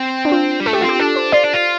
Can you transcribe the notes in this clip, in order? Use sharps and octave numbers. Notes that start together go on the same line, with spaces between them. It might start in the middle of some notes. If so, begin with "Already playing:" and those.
Already playing: C4
D4
F4
G3
A3 A4
G4
C4 F4
G4
D4 A4
C5
F4 D5
D4
F4